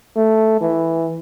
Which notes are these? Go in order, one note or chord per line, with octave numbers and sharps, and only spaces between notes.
A3
E3